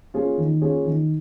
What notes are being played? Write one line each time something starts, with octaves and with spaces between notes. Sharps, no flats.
A#3 C#4 F4 G#4
D#3
A#3 C#4 F4 G#4
D#3